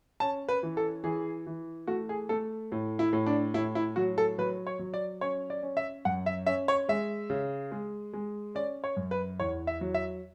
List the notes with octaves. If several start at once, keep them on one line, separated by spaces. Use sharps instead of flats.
C#4 A5
B4
E3
A4
E3 G#4
E3
A3 F#4
G#4
A3 A4
A2
E4
A2
D4
A2 E4
E4
F#3 F#4
A4
F#3 B4
C#5
F#3
D5
C#4 C#5
D5
C#4
E5
F#2 F#5
E5
C#4 E5
C#5
G#3 E5
C#3
G#3
G#3
C#4 D5
C#5
F#2
B4
E2 C#5
E5
F#3
E5